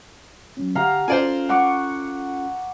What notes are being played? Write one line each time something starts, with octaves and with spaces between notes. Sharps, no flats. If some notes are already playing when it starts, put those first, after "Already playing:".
F#3 C#4
D3 G4 F5 F#5 A#5
C#4 F4 A4 C5 D5 G#5
F#5 C#6 D6